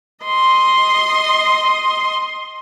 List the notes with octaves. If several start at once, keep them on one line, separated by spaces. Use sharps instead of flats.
D#5 C6